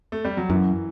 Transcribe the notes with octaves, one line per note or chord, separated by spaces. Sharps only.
A3
G3
F#3
F#2 E3